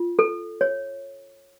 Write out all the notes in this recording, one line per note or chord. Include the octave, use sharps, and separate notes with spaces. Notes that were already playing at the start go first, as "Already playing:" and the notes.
Already playing: F4
A4
C#5